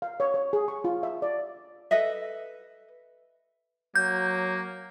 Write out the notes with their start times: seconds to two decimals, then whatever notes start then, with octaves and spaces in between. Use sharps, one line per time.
0.02 F5
0.20 C#5
0.34 C#5
0.53 G#4
0.68 C#6
0.84 F4
1.03 E5
1.22 D5
1.91 A4 B4 D#5 E5
3.95 F#3 A#3 G6